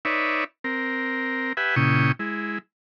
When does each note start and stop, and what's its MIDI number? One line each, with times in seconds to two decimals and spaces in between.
0.05 0.44 63
0.05 0.44 71
0.05 0.44 73
0.05 0.44 74
0.05 0.44 76
0.64 1.53 60
0.64 1.53 70
1.57 1.75 67
1.57 1.75 71
1.57 1.75 76
1.57 1.75 78
1.57 1.75 80
1.76 2.12 46
1.76 2.12 49
1.76 2.12 64
1.76 2.12 79
1.76 2.12 85
1.76 2.12 87
2.19 2.59 56
2.19 2.59 64